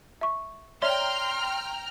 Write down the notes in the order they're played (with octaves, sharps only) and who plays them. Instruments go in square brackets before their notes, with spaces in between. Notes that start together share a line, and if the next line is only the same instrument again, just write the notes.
[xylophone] E5 C#6
[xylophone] C#5 D5 E5 [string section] G5 A#5 F6 [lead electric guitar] C6